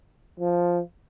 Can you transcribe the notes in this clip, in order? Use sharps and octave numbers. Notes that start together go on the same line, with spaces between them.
F3